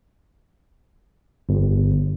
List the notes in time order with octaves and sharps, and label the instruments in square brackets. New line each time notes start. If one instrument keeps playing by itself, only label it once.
[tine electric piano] G1